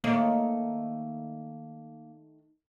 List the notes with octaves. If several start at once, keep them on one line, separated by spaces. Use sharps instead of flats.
D#3 A3 A#3 C#5